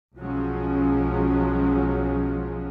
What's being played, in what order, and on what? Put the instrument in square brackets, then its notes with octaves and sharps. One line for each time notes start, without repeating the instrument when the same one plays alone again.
[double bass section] B1 F3 F#3 G#3 C#4